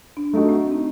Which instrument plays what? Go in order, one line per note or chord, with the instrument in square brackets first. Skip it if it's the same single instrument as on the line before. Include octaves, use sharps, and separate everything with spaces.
[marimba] D4
[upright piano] A3 D#4 F#4 [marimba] D4
[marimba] C4
D#4